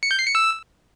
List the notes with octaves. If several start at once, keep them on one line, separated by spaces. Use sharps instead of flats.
C#7
G6
C7
C#7
E6